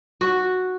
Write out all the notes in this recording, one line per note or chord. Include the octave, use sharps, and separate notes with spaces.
F#4